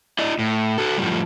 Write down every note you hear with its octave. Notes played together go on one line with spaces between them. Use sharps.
E4 D5 D#5
A2
F#4 A4
F#2 A2 F3 G3